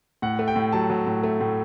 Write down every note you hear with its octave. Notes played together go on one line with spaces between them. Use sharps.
A2 F#5
A3
G5
A2
F#3 A5
F#3
A2
A3
A2